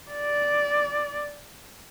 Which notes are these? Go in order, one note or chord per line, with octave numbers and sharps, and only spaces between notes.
D5